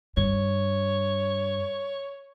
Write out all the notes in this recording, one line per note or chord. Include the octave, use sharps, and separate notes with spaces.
G2 C#5